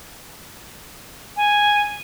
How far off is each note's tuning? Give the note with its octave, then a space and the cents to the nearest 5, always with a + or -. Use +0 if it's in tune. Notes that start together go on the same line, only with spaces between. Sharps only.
G#5 -5